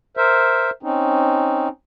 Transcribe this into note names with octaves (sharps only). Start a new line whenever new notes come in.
A#4 C5 E5
C4 C#4 D#4